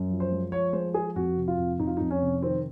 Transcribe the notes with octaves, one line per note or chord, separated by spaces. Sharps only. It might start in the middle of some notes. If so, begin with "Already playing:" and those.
Already playing: F#2
F3
C5
G#3
F3 C#5
G#3 C5
F3 G#4
F2 F#4
C3
F4
F2
F2 D#4
F4
F2 D#4
C#4
C3
D#3 C4